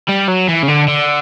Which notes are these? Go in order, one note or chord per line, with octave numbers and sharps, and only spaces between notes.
G3
F#3
E3
C#3
D3
D3